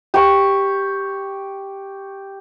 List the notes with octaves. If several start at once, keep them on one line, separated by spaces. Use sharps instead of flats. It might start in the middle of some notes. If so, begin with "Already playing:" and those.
G4 C#6